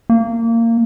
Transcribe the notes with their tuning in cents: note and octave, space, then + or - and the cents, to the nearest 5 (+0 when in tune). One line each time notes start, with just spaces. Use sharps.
A#3 -20